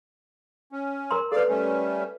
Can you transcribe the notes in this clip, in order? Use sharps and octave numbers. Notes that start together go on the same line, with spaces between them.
C#4
A#4 A#5 C6
A4 B4 D5 F5
G3 A3 C#4